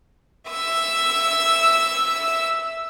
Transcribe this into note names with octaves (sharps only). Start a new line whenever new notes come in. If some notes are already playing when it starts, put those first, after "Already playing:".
E5 E6